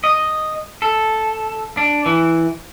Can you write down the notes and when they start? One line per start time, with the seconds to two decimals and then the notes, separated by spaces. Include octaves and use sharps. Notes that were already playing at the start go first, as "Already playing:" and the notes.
0.04 D#5
0.82 A4
1.77 D4
2.06 E3